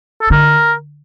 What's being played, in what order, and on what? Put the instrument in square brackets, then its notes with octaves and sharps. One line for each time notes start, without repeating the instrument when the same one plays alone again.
[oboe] A4
[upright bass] D3 [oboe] A#4